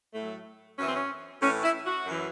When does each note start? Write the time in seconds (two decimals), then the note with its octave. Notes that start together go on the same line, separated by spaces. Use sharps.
0.14 A2 F#3 A3
0.78 F#2 C#4
0.82 E3 C4
0.94 C#4
1.42 A2 E3 C#4
1.64 E4
1.86 F#4
2.06 F#2 E3